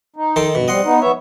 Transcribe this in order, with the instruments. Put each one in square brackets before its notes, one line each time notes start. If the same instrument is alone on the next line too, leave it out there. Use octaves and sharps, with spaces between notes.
[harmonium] D#4
[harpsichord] D#3 A4 C6
[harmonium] G2 [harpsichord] B2
[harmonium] G3 C4 [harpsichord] D#5 F#5 C6
[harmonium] B3 D#4
B3 C#5 E5